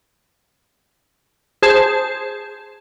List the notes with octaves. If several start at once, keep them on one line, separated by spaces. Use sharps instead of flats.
G#4 C5 A5